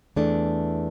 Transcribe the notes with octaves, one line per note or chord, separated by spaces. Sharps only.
E2 E3 A3 D4